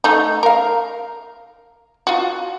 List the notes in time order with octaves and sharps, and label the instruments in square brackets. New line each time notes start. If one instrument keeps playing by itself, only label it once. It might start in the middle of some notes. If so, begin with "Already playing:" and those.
[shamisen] A3 D#4
A#4 F5
F4 F#4